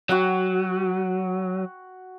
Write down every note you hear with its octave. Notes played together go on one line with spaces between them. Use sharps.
F#3 F#4 F#5 G5